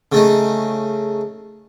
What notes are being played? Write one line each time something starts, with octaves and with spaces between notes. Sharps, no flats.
C#3 A3 D#4